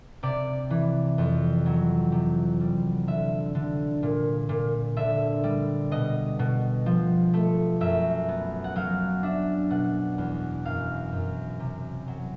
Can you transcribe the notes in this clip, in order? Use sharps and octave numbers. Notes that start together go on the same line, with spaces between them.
C3 D5
E3
F2
F#3
C3
G3
D3 E5
D3
A#2
A#2
D3 E5
G3
B2 D#5
B2
F3
A3
F#2 E5
B3
F#5
F#3 F5
D4 E5
B2 F#5
E2
F#2 F5
F#2
C3
F#3